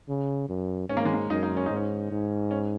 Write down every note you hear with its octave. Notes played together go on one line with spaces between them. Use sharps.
C#3
F#2
G#2 C#4
A#3
G#3
A#3
F#2 D#4
D#4
C#4
G#2 D#4
C#4
G#2
C#4